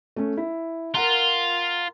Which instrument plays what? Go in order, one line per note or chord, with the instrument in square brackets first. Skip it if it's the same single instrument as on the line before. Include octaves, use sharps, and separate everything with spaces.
[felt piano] A3 C#4
E4
[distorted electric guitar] F4 [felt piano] A#4 F#5 A#5